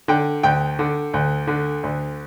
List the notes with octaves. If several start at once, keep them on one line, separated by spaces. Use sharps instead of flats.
D3 G5
D2 G5
D3
D2
D3
D2